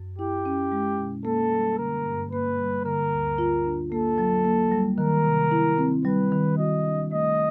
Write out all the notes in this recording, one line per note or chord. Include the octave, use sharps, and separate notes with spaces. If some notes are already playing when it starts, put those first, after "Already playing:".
Already playing: F#2
E4 G4
C#4
G#3
B2
A#3 A4
G3
D3 A#4
G2
A#3 B4
G3
D3 A#4
D2
F4
D4
A#3 A4
F#3
A#3
G3
D#3 A#4
C3
E4
C4
G3 B4
D#3
F#4 D#5
D4
A3 D#5